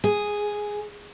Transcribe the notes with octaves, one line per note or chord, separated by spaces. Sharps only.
G#4